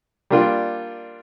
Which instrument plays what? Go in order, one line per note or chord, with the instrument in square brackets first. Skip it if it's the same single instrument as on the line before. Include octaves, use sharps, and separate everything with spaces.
[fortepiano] G3 A#3 D4 F4